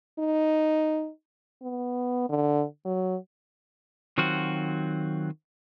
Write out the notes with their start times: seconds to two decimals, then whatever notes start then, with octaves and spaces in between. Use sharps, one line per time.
0.19 D#4
1.62 B3
2.29 D3
2.85 F#3
4.18 D#3 F#3 C4 F4 F#4